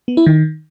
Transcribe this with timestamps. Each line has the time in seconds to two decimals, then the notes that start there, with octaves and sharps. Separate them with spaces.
0.08 B3
0.17 E4
0.26 D#3